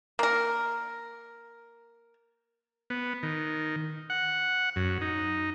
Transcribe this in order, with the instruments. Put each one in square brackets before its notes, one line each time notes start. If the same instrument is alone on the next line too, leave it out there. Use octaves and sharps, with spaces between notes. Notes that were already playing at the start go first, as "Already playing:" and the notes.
[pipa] A#3 A#4
[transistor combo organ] B3
D#3
F#5
F#2
D#4